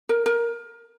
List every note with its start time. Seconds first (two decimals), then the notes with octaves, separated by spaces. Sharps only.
0.09 A#4
0.26 A#4